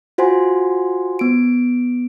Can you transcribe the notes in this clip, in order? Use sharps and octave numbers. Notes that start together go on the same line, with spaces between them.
F4 F#4 C5 F#5 G#5 C6
B3 D7